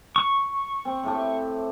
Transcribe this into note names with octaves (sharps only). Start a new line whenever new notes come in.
C#6
C4
A2 A3 G4